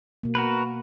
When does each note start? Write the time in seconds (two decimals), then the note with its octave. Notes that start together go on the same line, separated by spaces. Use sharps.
0.23 B2 A#3
0.35 F#4 A#4 B4